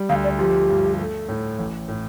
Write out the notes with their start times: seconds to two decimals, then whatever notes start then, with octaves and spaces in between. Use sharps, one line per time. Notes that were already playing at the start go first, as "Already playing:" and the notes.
Already playing: G3
0.09 D2 F5
0.24 D5
0.39 F3 G4
0.69 G2
0.99 A3
1.29 A2
1.59 A1
1.88 A2